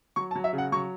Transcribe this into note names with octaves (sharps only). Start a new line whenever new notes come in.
F#3 C#6
A5
F#3
E5
C#3
F#5
F#3 C#6